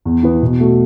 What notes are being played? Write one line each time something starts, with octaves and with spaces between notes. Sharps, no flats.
E2
E3 B3
B2
A3 F#4